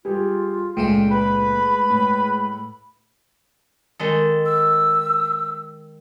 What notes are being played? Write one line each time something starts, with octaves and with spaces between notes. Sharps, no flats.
G3 F4 G4 G#4
C#2 A#2 G#3 A3 G#4 G5
B4 B5
A2
D#3 G#3 A4
E6